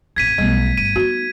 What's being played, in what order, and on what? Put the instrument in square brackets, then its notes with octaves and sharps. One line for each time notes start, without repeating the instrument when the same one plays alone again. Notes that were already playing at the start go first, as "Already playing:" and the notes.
[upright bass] A1 F2 [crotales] G#6 B6 D#7
[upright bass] B1 [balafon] G3 A3 B3
[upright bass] G1 G3 [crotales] D#7
[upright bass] B3 D#4 [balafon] F#4